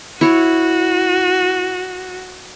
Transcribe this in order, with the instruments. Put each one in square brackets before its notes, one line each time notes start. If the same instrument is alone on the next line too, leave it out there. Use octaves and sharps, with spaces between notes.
[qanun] E4 C#5 [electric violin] F#4